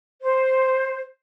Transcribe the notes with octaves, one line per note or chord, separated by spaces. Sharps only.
C5